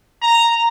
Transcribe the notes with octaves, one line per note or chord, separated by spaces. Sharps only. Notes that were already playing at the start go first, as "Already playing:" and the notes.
A#5